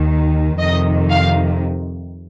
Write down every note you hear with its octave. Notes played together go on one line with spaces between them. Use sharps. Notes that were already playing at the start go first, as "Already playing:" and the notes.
Already playing: D#2 D#3
F2 C3 D#3 D#5
F5